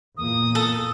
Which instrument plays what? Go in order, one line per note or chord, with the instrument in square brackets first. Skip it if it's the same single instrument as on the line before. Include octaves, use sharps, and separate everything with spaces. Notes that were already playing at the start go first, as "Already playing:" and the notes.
[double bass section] E2 A#2 A#3 [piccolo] D#6
[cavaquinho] A4